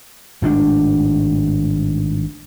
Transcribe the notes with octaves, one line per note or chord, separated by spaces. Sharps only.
G#1 A2 D#3 D4